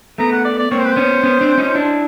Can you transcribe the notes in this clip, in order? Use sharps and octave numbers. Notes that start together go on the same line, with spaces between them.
A3 B3 A#5
F#5
D5
D5
A#3 C4 C#5
C5
B4
B3 C#4 C5
B3 C#4
C4 D4
C#4 D#4
D4 E4